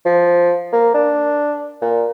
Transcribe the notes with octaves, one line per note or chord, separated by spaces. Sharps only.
F3
A#3
D4
A#2